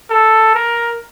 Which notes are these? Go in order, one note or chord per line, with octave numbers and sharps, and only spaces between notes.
A4
A#4